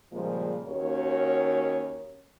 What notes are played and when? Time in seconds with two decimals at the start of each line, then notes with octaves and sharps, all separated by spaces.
0.12 A#2 C#3 F3 G3 G#3 A#3
0.67 D#2 C#4 F#4 A#4 C#5